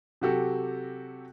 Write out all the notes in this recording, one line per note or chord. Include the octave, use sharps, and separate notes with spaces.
C3 F#3 F#4 G4 A4